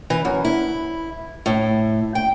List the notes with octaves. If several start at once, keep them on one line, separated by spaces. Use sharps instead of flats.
E3
F#2
E4
A2
G5